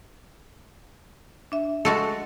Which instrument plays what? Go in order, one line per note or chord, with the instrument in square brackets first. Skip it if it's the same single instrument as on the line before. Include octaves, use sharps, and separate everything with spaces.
[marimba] D4 E5
[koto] G#3 F#4 A4